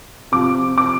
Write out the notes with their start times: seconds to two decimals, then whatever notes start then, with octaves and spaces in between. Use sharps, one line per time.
0.32 C3 F3 D6
0.78 D6